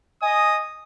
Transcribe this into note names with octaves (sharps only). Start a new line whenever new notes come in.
D#5 G#5 D#6